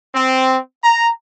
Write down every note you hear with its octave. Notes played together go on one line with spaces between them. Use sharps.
C4
A#5